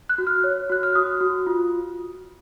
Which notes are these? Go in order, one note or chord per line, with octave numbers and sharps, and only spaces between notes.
F#6
F#4
F6
C#5
F#4 F#6
F6
F#4 D#6
F#4
F4